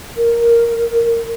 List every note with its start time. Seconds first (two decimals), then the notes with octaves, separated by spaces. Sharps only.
0.17 A#4